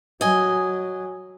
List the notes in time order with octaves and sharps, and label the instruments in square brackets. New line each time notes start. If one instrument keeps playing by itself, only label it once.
[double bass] F#3 [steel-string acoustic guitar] D#5 G#5